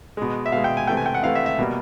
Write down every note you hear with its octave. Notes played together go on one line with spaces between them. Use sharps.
B2 G#3
E5
B2 G#3 F5
G5
G#5
C3 E3 A3 G5
G#5
G5
F#5
C3 E3 A3 F5
E5
E5
B2 G3 A#3